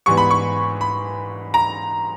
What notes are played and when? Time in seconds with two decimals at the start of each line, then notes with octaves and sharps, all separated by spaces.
0.06 G#2 E3 G3 B3 C#6
0.17 B5
0.31 C#6
0.81 B5
1.54 A#5